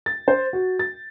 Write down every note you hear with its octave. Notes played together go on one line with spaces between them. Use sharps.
A6
C5
F#4
A6